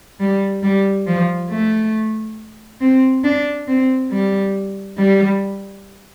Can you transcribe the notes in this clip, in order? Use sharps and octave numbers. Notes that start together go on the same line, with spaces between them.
G3
G3
F3
A3
C4
D4
C4
G3
G3